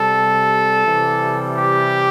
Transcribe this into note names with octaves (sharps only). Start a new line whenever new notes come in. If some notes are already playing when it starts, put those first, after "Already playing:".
Already playing: C3 G3 A4
C3 E3 G3
G4